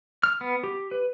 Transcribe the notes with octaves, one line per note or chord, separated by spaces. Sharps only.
F6
B3
G4
B4